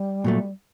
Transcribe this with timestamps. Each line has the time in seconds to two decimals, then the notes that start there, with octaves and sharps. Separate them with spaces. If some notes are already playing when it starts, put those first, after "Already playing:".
Already playing: G3
0.24 A#2 F#3 A3